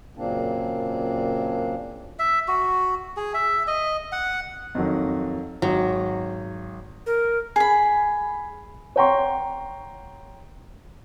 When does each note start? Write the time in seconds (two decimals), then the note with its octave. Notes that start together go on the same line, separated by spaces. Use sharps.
0.17 F#2 A#2 C#3 A#3 C4 D4
2.19 E5
2.48 F#4
3.17 G#4
3.34 E5
3.67 D#5
4.12 F#5
4.75 F2 D#3 F#3
5.62 G#1 F#3
7.06 A#4
7.56 G#4 B5
8.96 C#5 F#5 G5 A#5 C6 C#6